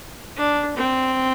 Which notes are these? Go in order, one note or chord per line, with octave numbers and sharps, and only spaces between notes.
D4
C4